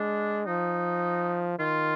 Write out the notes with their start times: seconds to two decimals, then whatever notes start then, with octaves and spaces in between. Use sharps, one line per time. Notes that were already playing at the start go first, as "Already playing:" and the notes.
Already playing: G#3 D4
0.46 F3 D#4
1.59 D#3 F4